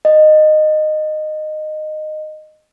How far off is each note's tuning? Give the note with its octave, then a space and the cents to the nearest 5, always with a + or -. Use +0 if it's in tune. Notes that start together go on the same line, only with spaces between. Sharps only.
D#5 -15